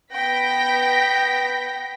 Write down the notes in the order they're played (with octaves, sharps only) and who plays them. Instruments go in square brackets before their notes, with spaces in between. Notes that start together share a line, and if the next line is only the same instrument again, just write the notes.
[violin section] B3 G5 A#6 B6